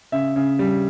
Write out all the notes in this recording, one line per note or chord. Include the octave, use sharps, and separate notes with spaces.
C#3 E5
C#3
G3